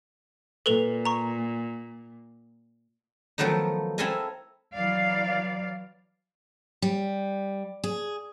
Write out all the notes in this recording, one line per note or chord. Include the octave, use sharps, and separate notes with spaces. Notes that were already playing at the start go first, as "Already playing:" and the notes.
A#2 A4 B4 F7
A#5 C#6
D#3 F3 F#3 A3 B3 D#4
C4 E4 A4 F5 G#5 A#5
E3 F#3 D5 F5
G3
G#4